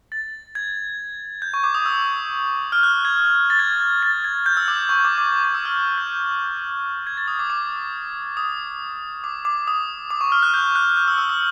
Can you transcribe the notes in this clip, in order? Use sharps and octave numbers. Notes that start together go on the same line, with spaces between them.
A6
G#6
G6
C#6
D6
D#6
E6
F6
F#6
G#6
A6
G#6
A6
G#6
G6
E6
D6
E6
C#6
D6
D6
D6
D6
E6
F6
F#6
G6
G#6
A6
D#6
D6
D6
D#6
D6
D6
D#6
D6
C#6
F6
F#6
G6
F#6
F#6
E6
E6
E6